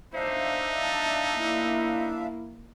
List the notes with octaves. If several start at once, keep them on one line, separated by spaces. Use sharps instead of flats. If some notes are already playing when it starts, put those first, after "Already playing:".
D4 D#4 C5 E5 F5
A5
A#3 E4